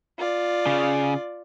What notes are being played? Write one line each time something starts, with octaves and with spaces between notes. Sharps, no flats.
F4 D5
C#3